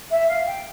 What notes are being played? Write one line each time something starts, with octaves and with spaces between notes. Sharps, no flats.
E5
F5
G5